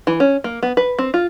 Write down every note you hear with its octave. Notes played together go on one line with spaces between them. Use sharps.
E3
C#4
A#3
B3
B4
C4
F4